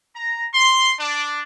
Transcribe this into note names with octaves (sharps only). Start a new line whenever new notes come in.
A#5
C6
D4